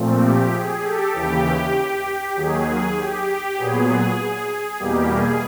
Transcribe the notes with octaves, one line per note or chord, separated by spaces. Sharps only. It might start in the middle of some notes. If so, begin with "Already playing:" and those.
Already playing: A#2 F3 A3 C4
G4
G#4
G4 A4
D#2 C#3 E3 G4
D#2 D#3 F#3 G#4
G4
A#2 F#3 B3 G#4
E2 B2 G3 A#3 G4
G#4